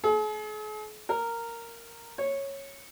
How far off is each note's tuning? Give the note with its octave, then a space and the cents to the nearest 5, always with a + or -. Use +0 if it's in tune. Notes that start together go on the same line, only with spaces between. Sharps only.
G#4 +45
A#4 -10
C#5 -10